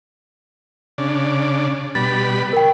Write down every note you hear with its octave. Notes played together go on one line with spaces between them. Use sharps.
C#3 D4
B2 G3 B5 A6
A#4 G5